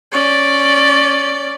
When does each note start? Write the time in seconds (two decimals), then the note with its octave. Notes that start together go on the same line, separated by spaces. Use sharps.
0.12 C#4 D5